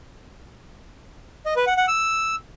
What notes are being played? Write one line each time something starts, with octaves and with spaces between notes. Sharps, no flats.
D#5
B4
F#5
F#5
E6